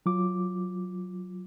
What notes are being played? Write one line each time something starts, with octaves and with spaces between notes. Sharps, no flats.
F#3 F4 D6